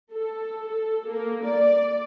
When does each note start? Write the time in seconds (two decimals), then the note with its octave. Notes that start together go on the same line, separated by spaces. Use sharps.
0.13 A4
0.69 A4
1.09 A#3
1.46 D5